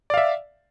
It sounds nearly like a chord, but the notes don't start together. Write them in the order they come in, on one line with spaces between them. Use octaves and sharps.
D5 F5 E5